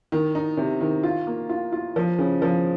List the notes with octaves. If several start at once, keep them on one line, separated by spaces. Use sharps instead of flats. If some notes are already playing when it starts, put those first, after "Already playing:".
D#3
D#4
C3
D#3
F4
A#3
F4
F4
F3
C#3
F3